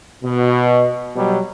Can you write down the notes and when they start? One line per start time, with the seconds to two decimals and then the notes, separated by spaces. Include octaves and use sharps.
0.23 B2
1.16 B2 F#3 G3